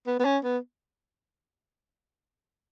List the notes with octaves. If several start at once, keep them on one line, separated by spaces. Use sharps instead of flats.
B3
B3
C#4
B3